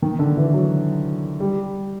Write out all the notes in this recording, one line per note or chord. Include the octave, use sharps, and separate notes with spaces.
D#3
D3
E3
F#3
G3